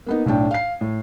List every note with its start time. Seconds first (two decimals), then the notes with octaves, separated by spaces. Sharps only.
0.06 A#3 B3 D#4
0.26 B1 A2 D4 G5
0.51 F5 C7
0.81 A2